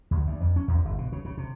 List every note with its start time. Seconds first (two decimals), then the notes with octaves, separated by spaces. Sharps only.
0.11 D2
0.27 D2
0.40 F2
0.56 C#4
0.68 E2
0.85 G1
0.98 B2
1.12 C#3
1.25 C#3
1.37 C3